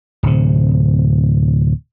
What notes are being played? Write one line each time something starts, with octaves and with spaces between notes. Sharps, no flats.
D1 C3